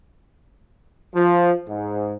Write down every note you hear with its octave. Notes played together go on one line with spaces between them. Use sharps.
F3
G#2